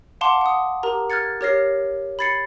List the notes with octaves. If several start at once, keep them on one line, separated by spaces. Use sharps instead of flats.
F5 F#5 A5 C6 D6
F#5 D#6
G4 A#4 A#5
F6 F#6 G#6 A6 C#7
G4 A#4 C#5 F6 A#6 C7
B5 G#6 A6 C7 C#7